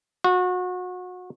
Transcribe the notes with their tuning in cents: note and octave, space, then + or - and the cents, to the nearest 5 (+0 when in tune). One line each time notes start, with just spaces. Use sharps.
F#4 -30